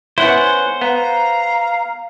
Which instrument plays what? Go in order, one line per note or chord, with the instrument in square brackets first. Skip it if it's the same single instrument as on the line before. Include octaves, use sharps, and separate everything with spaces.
[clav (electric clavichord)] B3 E4 [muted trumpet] C#4 [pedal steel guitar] C5 F#5
[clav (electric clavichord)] B3 [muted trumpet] F5 [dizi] A#5